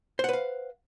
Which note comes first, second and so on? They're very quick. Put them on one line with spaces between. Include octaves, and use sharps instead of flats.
C5 F#5 B4 F5